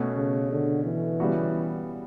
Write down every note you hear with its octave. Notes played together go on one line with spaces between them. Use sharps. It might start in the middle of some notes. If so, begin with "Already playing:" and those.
Already playing: B2 A3 C#4 F#4
C#3
D3
E3
C#3 G3 B3 F#4